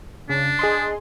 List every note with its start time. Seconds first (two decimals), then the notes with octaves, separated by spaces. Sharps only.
0.29 C#3 D4
0.59 G#4 D#5 C6